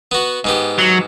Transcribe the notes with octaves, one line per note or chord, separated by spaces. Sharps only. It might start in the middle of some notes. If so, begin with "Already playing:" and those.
B3 F#4
G#2 B3 G4
F#3